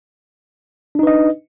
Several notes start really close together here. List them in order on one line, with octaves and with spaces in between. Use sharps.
D4 D#4 B4 D#5